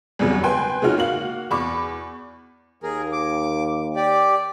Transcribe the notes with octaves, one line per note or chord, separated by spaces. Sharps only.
G#1 E2 C#3 F#3 G3
B4 G5 G#5 C6
C#3 F3 G#3 D#4 F#4 F6
A#3 F#4 F5 F#7
E2 B5 C#6 D6
D#2 G#4 A#4
D6
G4 D5